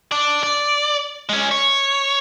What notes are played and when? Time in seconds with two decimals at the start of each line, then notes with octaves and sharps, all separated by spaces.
0.12 D4 D5
0.43 D5
1.29 G#3 C#4
1.51 C#5